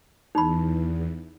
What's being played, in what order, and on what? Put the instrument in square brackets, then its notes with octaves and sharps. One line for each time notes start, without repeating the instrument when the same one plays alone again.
[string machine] E2 [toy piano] D#4 B5